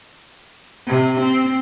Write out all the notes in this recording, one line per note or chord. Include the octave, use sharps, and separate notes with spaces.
C3
C4